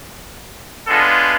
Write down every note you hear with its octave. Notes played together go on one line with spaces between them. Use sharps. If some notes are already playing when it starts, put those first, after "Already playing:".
G#3 B3 D4 F4 A4